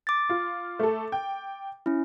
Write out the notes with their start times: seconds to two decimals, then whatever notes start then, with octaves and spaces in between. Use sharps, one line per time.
0.07 D6 A6
0.29 F4
0.79 A3 A4
1.12 G5
1.86 C#4 E4